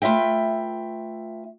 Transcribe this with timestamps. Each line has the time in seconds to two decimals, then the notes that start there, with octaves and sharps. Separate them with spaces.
0.02 A3 F4 B4 E5 G5